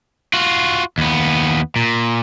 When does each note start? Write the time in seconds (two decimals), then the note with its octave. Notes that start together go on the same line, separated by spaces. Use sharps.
0.34 F4 F#4
0.98 D#2 B3
1.76 A#2